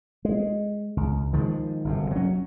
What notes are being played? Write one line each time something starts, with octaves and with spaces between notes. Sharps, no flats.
G#3
C#2
D#3 F3 G#3
G1 F#2 C3
F#3 C#4